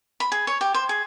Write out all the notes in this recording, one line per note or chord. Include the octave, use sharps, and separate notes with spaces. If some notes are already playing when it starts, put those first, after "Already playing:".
B5
G#4
C#5
G4
C5
G#4